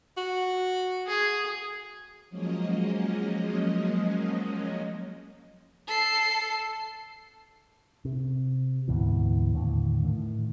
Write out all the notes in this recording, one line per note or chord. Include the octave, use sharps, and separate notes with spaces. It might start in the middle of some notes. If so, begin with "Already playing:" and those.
F#4
G#4
F3 F#3 G#3 A#3 C#4 D#5
A4 C7
C3
D2 G#2 B2 E3
D#2 A2 D3 E3
A2 D#3